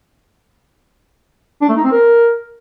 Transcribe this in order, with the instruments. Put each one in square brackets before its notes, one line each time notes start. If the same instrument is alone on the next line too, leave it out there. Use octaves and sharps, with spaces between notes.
[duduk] D4
A3
D#4
C4
A#4